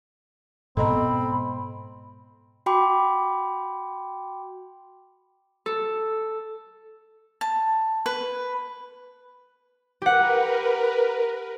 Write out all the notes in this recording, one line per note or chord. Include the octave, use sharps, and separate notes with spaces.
G#2 B2 B3 C4 A4 D#5 A#5 B5
F#4 G5 B5 C6 D6
A4
A5
B4
G4 A#4 B4 F#5